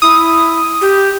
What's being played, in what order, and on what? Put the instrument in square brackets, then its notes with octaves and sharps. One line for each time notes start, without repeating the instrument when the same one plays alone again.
[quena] E4 [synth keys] D#6
[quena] G4